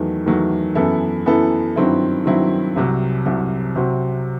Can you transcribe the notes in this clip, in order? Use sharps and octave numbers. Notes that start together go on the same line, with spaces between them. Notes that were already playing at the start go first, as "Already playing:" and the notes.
Already playing: E2 D#3 F#3 A3
E2 D#3 F#3 A3
F#2 E3 B3 E4 A4
F#2 E3 B3 E4 A4
G2 D#3 F#3 C4 E4
G2 D#3 F#3 C4 E4
C2 C3 F#3
C2 C3 F#3
C3 F#3 C4 F#4